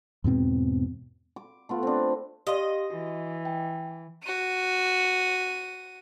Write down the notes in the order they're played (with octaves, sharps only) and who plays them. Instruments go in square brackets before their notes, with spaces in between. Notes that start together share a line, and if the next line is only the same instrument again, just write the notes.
[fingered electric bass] E2 G#2 B2 C4
[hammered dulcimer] D6
A3 B3 F4
C4 D4
[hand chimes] G4 F5 C6 [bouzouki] D#5
[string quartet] E3 [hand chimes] F#4
[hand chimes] G5
[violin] F#4 D#7